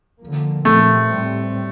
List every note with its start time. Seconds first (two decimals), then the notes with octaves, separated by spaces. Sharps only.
0.21 D3 F3 A#3
0.65 A#2 F3 A3 C4
1.10 A2 G3 C4